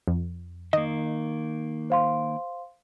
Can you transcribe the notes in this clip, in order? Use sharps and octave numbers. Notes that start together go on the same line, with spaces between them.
F2
D#3 A#3 D#5
C5 F5 C6